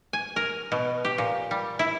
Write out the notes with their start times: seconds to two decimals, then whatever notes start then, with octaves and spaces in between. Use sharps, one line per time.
0.13 G#5
0.36 A#4
0.72 B2
1.05 G4
1.18 A#2
1.51 G3
1.79 E4